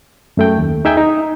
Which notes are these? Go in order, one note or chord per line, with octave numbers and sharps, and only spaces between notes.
F#2 A3 G5
D#2
D#4 G#4 E5 G5 G#5
D#4